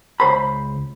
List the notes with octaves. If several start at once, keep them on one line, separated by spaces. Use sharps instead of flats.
C#2 C5 B5